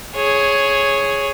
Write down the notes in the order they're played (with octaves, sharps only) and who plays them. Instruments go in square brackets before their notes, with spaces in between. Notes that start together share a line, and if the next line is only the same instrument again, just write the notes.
[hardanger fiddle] G#4 C#5